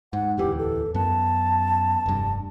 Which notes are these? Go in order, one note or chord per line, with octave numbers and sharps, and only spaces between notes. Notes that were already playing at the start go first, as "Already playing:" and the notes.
G#2 F#5
D1 E2 E3 G4
A4
F#2 B3 A5
F1 G2